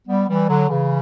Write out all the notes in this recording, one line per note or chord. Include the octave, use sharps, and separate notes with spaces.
G3 B3
E3 G3
D3 F#3
C#3 E3